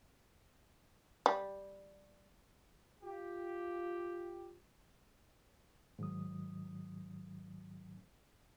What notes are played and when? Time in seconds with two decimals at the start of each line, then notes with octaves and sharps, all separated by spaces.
1.26 G3
3.03 F4 G4
5.99 G#2 D#3 F#3 D#6